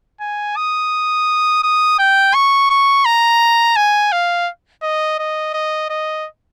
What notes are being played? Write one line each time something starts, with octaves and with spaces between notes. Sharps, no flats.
G#5
D#6
D#6
G5
C#6
C#6
A#5
G#5
F5
D#5
D#5
D#5
D#5